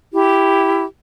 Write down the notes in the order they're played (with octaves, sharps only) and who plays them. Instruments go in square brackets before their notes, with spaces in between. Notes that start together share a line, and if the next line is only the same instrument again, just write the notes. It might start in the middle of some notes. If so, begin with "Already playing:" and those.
[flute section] E4 G4